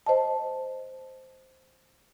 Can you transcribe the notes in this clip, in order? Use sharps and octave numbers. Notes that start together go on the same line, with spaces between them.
C5 D#5 A5